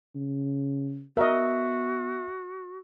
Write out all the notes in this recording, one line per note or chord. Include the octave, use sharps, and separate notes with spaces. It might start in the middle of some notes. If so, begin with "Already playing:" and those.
C#3
B3 F#4 A#4 D#5 E5